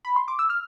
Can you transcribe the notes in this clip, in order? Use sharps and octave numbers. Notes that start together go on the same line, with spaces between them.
B5
C6
D6
E6
F6